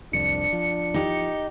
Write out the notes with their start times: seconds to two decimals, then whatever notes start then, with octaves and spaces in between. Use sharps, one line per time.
0.13 C2 F2 D4 C#7
0.53 F3
0.94 D#4 G4